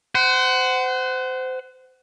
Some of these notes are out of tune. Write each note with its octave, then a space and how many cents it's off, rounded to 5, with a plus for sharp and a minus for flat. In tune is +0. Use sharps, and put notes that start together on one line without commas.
C5 -25 F#5 +20